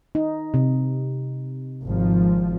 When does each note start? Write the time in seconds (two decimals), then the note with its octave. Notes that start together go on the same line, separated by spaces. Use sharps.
0.15 D#4
0.54 C3
1.85 G#1 F3